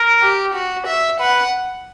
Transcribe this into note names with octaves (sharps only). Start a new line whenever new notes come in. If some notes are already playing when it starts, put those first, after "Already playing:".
Already playing: A#4
G4
F#4
E5
B4 F#5